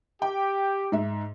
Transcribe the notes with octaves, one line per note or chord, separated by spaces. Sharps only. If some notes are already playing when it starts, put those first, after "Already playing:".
G4 G5
G#2 E5